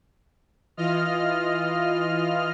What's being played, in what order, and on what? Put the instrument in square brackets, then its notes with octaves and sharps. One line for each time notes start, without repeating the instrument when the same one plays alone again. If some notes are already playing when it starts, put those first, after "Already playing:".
[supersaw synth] E3 F4 D#5 F6